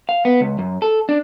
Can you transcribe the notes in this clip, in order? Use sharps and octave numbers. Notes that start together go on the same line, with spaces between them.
F5
B3
C#2
F#2
A4
D4